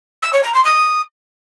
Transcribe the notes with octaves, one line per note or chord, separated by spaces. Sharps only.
E6
C#5
A#5
C6
D#6